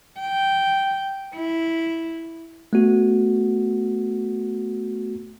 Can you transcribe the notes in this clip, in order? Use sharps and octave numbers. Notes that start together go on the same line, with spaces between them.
G5
E4
A3 B3 F#4